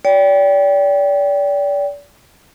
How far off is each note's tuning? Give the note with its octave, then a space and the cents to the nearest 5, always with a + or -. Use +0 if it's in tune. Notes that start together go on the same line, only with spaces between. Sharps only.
D5 -35 G5 +0